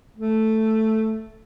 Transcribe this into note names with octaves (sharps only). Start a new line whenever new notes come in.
A3